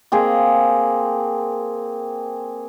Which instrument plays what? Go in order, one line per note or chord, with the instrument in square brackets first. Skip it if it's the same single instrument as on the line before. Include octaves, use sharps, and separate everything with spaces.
[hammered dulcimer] A#3 C4 G#4